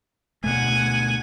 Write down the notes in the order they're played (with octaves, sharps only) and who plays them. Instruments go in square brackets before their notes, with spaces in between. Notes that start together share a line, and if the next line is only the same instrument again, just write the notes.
[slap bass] D2 B2 A3 [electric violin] F#5 G#5